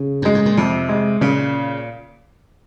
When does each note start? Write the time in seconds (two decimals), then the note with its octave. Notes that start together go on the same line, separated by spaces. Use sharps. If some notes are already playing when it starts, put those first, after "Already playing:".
Already playing: C#3
0.22 F#2 G#3
0.35 G#2
0.46 A#2
0.57 F2 C3
0.89 G#3
1.21 A#2 C#3